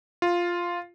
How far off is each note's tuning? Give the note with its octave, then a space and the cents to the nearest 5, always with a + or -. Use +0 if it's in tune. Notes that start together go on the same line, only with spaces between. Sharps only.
F4 +0